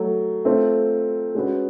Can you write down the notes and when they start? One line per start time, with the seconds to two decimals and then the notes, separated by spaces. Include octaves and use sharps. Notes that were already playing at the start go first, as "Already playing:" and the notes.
Already playing: F#3 A3
0.45 A3 C4 F4
1.35 G#3 C#4 F#4 B4